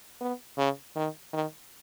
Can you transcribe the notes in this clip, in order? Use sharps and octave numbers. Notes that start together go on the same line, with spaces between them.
B3
C#3
D#3
D#3